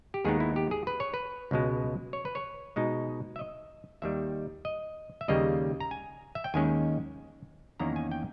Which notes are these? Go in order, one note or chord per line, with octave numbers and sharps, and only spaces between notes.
G4
D#2 D#3 G#3 B3 D#4 G#4
E4
G4
G#4
B4
C#5
B4
C#2 B2 G#3
C#5
B4
C#5
B2 G#3 D#4
E5
D#5
D#2 D#3 G3 E5
D#5
E5
D#2 C#3 G3 A#3 D#5
A#5
G#5
E5
G5
D#2 D#3 G#3 C#4 G#5
E2 D#3 A#3 C#4 A#5
G#5
G5